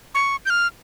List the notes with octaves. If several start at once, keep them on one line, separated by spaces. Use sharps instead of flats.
C#6
G6
F6